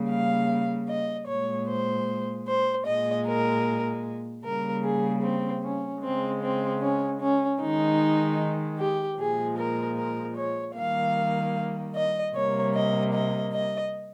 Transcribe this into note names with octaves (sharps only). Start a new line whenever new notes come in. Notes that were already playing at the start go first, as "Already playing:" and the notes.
Already playing: C#3 G3 A#3
F5
D#5
A#2 G#3 C#5
C5
C5
A#2 G#3 D#5
A#4
C#3 G3 A#3 A#4
G#4
C4
C#4
C#3 G#3 C4
C4
C#4
C#4
D#3 G#3 D#4
G4
A#2 F3 G#3 G#4
A#4
A#4
C#5
D#3 G3 A#3 F5
D#5
C3 G3 A#3 C#5
D#5
D#5
D#5